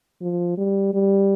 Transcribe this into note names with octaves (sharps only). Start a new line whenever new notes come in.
F3
G3
G3